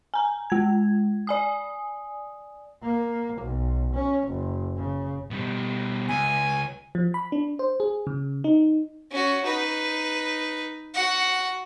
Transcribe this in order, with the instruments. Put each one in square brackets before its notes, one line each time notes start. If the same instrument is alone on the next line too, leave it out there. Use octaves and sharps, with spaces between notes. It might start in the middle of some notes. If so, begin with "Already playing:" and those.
[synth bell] G#5 A#5
G#3 G#6
D5 G#5 D#6
[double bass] A#3
B1
C#4
F#1
C#3
[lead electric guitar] B2 G3
[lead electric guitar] C#2 [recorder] G#5
[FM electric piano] F3
B5
D4
C5
G#4
C#3
D#4
[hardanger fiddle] C#4 F#4
D#4 B4
F#4 F#5